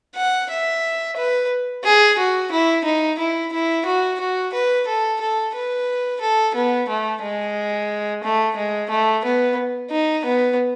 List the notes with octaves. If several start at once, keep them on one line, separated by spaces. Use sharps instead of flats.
F#5
E5
B4
G#4
F#4
E4
D#4
E4
E4
F#4
F#4
B4
A4
A4
B4
A4
B3
A3
G#3
A3
G#3
A3
B3
D#4
B3